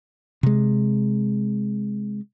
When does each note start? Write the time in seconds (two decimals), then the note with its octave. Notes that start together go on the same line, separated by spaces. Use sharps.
0.43 C3 G#3